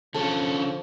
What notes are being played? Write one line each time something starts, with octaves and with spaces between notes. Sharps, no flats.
D3 F3 C#4 A4